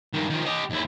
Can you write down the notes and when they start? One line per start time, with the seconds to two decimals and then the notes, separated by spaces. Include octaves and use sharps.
0.14 G2 D#3
0.30 D#3 F3
0.46 G4 D#5
0.71 D#2 E4